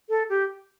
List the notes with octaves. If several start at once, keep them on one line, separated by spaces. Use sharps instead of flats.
A4
G4